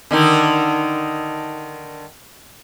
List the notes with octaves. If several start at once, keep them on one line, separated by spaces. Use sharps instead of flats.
D3 D#3 D#4